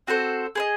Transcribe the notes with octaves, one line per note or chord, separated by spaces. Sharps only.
C4 F#4 A4 C5
G#4 C5 D#5